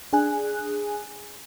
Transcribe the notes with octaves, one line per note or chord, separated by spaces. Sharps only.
D4 G#4 G#5 F#6